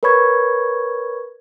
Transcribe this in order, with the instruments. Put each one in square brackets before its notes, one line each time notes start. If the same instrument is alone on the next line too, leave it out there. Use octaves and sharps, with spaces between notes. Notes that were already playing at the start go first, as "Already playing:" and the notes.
[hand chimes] A#4 B4 C#5 B5 C#6 G#6